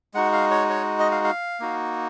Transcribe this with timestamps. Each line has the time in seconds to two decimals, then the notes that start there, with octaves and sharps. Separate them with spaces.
0.14 G#3 D#4 F#4 F#5
0.33 F5
0.51 C#5
0.70 C#5
0.99 D#5
1.11 F5
1.24 F5
1.60 A#3 D#4 F#4